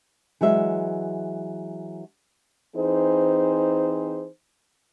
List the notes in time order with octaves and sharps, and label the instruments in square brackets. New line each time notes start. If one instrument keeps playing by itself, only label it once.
[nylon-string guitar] E3 F#3 G#3 E5
[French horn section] E3 C4 D#4 G#4 C5